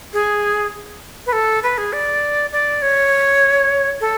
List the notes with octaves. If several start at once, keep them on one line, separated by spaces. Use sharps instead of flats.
G#4
B4
A4
B4
G#4
D5
D5
C#5
A4